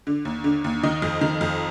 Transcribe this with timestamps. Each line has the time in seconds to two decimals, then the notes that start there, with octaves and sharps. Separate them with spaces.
0.07 D3
0.25 D#2
0.44 D3
0.64 D#2
0.83 D#3 D#5
1.02 F2
1.21 D#3
1.41 F2